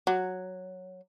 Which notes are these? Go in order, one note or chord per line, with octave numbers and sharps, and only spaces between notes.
F#3